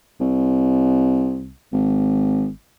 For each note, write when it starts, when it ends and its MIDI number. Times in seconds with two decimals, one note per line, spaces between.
0.21 1.52 36
1.73 2.48 32